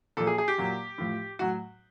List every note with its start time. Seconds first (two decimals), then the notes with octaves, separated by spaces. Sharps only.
0.17 A#2 F3 A4
0.27 G#4
0.38 G#4
0.48 G4
0.58 A#2 F#3
0.98 A2 F3
1.39 A2 F#3 F#4